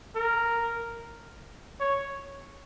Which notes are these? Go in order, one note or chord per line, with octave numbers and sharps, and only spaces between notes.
A#4
C#5